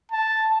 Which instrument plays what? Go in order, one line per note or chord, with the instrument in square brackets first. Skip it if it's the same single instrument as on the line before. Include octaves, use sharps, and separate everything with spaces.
[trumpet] A5